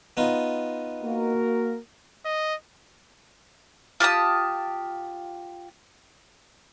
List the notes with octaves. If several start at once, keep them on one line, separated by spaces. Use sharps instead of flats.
B3 D#4 F4
A#3 F#4 A#4
D#5
F4 G4 A5 D#6